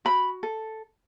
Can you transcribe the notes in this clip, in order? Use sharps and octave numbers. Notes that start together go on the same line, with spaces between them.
F#4 B5
A4